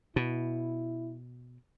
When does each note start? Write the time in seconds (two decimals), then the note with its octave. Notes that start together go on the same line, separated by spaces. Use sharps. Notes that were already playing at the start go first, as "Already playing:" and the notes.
0.16 B2 E4